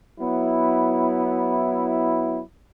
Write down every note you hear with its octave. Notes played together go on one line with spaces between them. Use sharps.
F#3 B3 E4